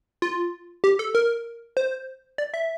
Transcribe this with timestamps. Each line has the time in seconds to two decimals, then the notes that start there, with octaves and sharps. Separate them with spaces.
0.22 F4
0.84 G4
0.99 A4
1.15 A#4
1.77 C5
2.38 D5
2.54 E5